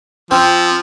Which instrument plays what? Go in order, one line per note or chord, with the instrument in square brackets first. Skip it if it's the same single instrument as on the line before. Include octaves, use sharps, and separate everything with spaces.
[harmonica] F3 [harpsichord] C4